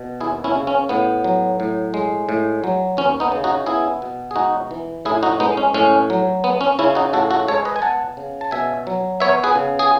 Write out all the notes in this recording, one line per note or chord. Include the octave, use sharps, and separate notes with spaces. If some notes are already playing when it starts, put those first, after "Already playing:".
Already playing: B2
D#2 E4 G#4
C#4 E4
C#3
C#4
A2 B3
F#3
A2
G#3
A2
F#3
D#2 C#4
B3 D#4
C#3
D#4 F#4
B3 E4 G#4
B2
G#4
G#2 D#4 F#4
E3
A2 E4 G#4
D#4 F#4
G#3 B3 D#4
C#4
A2 C#4
F#3
B3
C#4
C#3 C#4 E4
D#4 F#4
A2 F#4 A4
F#4 A4
G#3 A4 C#5
B4 D#5
G#5
B3 F#5 A5
C#3
A5
B2 E5 G#5
F#3
B3 C#5 E5
G#4 B4
C#3
G#4